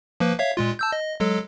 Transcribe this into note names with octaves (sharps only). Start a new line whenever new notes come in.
F3 A#3 B4
C#5 E5 F5
A#2 G#3 F4
A5 E6 G6
D#5
F#3 G#3 A4